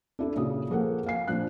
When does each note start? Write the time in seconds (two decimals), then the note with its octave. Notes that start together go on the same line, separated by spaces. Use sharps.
0.19 D4 E4 A4
0.36 A#2 C#3 F#4 D#6
0.70 F3 A#3 G#4 A4 F#5
1.06 F5 G#5 C7
1.28 A#2 F3 D4 F#6